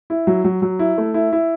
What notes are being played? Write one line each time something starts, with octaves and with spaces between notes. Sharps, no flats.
E4
F#3
F#3
F#3
E4
A3
E4
E4